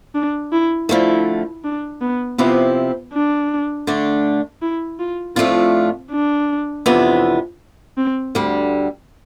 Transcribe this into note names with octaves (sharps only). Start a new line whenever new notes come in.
D4
E4
D3 F3 A3 E4
D4
B3
C3 F3 B3 C4 E4 G4
D4
D3 A3 D4
E4
F4
A2 F3 A3 C4 D4 F4
D4
F2 C3 E3 B3 D4
C4
D2 D3 G3